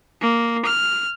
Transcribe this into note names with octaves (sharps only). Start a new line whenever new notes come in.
A#3
F6